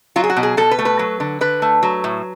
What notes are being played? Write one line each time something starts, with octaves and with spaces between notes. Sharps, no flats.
F#3 F4
G#4
F#4
B2
G#4
B2 A4
B4
A3
B4
F#3
D3
D3 B4
A3
F#3
A2